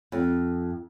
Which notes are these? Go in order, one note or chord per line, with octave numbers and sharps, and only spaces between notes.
F2